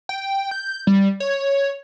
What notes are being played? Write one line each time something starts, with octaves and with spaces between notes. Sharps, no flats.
G5
G6
G3
C#5